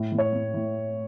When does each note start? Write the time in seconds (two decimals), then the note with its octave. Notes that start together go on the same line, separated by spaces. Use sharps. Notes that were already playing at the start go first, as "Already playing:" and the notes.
Already playing: A2
0.12 A2
0.18 C#5
0.33 A2
0.54 A2